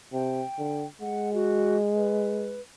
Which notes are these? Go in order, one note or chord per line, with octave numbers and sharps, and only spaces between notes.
C3 G5
D3
G#3 F#5
F#4
B4